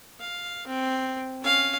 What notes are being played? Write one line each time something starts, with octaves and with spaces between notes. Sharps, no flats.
F5
C4
C#4 F5